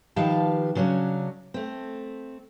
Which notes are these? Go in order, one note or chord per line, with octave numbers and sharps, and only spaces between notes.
D#3 F3 G4 B4 F5 A5
C#3 F#3 C#4 D4
A3 C4